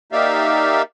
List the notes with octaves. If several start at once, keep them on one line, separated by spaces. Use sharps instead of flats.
A#3 D#4 G4 D5 E5 F5